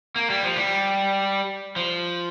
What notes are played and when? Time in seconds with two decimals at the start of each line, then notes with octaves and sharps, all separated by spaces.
0.16 A#3
0.30 G3
0.43 F3
0.56 G3
1.76 F3